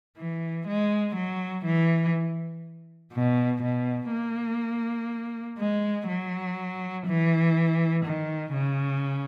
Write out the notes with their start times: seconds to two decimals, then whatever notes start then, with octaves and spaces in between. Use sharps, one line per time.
0.17 E3
0.66 G#3
1.15 F#3
1.64 E3
3.12 B2
3.62 B2
4.11 A#3
5.58 G#3
6.07 F#3
7.06 E3
8.05 D#3
8.53 C#3